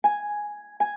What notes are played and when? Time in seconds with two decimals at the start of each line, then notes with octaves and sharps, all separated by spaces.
0.04 G#5
0.80 G#5